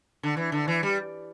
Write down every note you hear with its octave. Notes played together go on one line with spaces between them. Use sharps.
D3
E3
D3
E3
G3